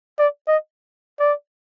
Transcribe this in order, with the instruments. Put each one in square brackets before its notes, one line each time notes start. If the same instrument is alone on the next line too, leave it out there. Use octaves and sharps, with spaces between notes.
[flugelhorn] D5
D#5
D5